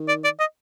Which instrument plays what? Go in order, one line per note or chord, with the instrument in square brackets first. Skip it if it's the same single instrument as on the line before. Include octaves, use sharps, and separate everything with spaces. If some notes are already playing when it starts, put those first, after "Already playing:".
Already playing: [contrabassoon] D#3
[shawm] D5
D5
D#5